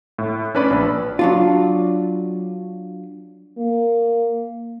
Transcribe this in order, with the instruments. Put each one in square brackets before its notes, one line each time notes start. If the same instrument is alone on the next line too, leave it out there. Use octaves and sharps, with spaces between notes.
[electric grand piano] A2
C#4 D4 B4 D5 B5
A#1
[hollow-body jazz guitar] F#3 D4 F4
[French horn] A#3